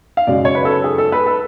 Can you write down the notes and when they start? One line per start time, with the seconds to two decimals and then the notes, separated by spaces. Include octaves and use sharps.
0.17 F5
0.27 F#2 C#3 G#3 D5
0.45 C#5
0.55 B4
0.65 A4
0.84 G#4
0.98 A4
1.12 B4
1.26 A4